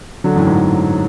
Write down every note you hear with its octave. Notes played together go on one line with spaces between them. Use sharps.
D3 F#3
F#2 A2
G#2